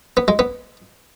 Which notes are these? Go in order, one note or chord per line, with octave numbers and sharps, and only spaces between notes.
B3
G#3
B3